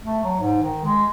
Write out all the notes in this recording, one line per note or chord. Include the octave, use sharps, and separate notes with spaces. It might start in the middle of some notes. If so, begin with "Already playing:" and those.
A3
F#3
G#2
D#3
G#3